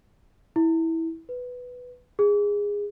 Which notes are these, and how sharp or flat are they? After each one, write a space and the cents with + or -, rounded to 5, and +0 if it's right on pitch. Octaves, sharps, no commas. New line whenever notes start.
E4 -15
B4 +5
G#4 -15